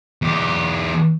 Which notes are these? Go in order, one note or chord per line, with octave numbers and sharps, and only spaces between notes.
E2 G4